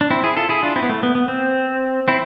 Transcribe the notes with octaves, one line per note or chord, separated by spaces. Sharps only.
D4
C4 E4
E4 G#4
F4 A4
E4 G#4
D4 F4
C4 E4
B3
A3
B3
B3
C4
C4 E4